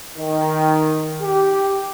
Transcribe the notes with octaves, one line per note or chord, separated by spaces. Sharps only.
D#3
G4